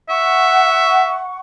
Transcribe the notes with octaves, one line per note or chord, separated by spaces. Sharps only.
E5 F#5 C#6